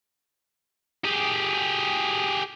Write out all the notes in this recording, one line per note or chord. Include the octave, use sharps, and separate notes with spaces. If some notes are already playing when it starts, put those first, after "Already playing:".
G4 G#4